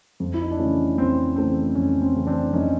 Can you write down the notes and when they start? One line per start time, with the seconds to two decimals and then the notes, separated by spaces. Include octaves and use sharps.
0.20 F2
0.34 E4
0.42 D#4
0.51 D4
0.59 C#3 E3 A3 C#4
0.98 F2 C4
1.36 C#3 E3 A3 C4
1.75 F2 C#4
2.02 C4
2.14 C#3 E3 A3
2.27 C4 D4
2.52 F2 C#4 D#4